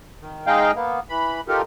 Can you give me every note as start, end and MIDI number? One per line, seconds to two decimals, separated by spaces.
0.21 0.46 51
0.47 0.72 56
0.47 0.72 63
0.47 0.72 68
0.47 0.72 75
0.47 0.72 77
0.47 0.72 79
0.75 1.00 58
0.75 1.00 59
1.09 1.41 52
1.09 1.41 83
1.48 1.62 63
1.48 1.62 65
1.48 1.62 67
1.48 1.62 69
1.48 1.62 70